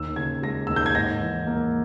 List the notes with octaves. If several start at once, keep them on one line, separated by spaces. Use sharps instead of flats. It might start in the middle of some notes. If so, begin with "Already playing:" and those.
Already playing: D#2 E6
C#3 G#6
G#3 A#6
D#2 E6
G6
G#6
G#2 A#6
E3
A#3